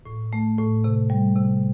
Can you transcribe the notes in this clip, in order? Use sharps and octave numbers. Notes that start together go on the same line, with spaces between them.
A2
A3
A2
C3
G3
C3